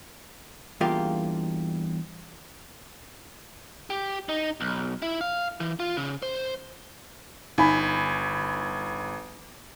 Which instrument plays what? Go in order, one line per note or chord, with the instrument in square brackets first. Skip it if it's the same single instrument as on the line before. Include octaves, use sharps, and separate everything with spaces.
[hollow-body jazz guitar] E2 G2 A#3 F4 G4 F5
[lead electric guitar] G4
D#4
B1
E4
F5
E3
F4
C#3
C5
[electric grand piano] G1 [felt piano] D#4 G#5 B5